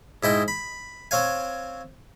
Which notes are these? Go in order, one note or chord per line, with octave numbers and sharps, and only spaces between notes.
G#2 E4 D#5 G5
B5
C4 C#5 F5 G#5